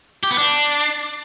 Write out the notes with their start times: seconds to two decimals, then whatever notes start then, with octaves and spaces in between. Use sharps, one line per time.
0.23 G4
0.31 B3
0.38 D4